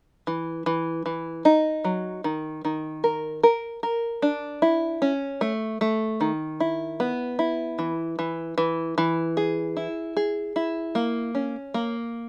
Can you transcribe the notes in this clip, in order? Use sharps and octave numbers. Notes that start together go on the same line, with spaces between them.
E3
E3
E3
D#4
F#3
D#3
D#3
A#4
A#4
A#4
D4
E4
C#4
A3
A3
D#3
E4
B3
E4
E3
E3
E3
E3
G#4
E4
G#4
E4
A#3
C#4
A#3